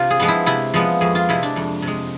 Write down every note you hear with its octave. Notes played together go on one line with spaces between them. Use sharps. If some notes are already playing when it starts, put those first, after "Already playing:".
Already playing: C3 F4
G#4
F3 G#3 B3
E4
C3 E4
F3 G#3 B3
F2 G#4
F4
C3 G#3 E4
D4
F2
C3
G#3